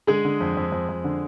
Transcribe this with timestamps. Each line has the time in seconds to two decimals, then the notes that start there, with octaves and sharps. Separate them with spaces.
0.07 D3 G#3 G#4
0.25 D3
0.40 F2
0.57 F2
0.72 F2
0.89 F2
1.04 D3